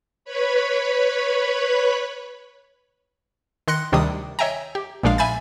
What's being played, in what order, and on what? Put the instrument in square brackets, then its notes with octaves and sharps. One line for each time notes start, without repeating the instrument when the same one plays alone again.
[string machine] B4 C#5 B5
[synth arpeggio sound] D#3 C6 F#6 A#6 C#7
D2 C3 D#3 G3 D4 D#6
C#5 D#5 E5 G5 G#5 A#5
G4
A#1 A#2 G#3 D4 F5
E5 G#5 B5 G6 A6